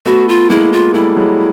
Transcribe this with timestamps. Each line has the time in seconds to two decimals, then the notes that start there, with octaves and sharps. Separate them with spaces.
0.06 A3 B3 F#4
0.29 F4
0.50 G#3 A#3 E4
0.73 F4
0.94 G3 A3 E4
1.16 F#3 G#3